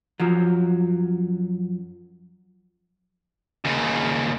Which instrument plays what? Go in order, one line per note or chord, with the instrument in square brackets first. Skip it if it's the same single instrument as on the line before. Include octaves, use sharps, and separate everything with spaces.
[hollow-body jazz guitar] F#2 F3 F#3
[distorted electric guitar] D#2 C#3